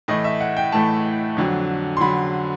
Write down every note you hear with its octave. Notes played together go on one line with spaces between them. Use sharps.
A2 E3 A3 D#5
E5
F#5
G5
A2 E3 A3 A5
F2 D3 F#3
C6
D3 F#3 B5